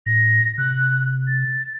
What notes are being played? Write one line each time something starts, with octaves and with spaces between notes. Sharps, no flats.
A2 A#6
C3 F#6
A6